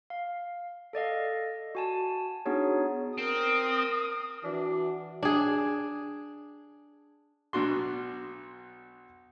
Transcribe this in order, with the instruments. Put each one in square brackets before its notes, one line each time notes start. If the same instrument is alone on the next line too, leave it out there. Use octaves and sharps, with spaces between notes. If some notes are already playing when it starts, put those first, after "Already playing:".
[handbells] F5
A4 D5 D#5 F5
F#4 G#5 A5
B3 D4 D#4 F#4 G#4 C#5
[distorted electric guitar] C4 [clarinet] A#4 [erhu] D#6
[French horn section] E3 F#4 [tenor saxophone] D4
[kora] D4 G#4
[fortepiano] B1 B2 D4 F#4 C6